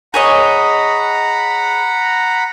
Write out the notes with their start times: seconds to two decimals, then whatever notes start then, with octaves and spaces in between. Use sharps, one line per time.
0.14 G#4 C#5 D#5 F#5 A#5 B5